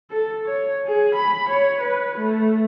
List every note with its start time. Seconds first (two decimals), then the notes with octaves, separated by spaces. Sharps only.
0.11 A4
0.46 C#5
0.87 G#4
1.15 B5
1.49 C#5
1.80 B4
2.18 A3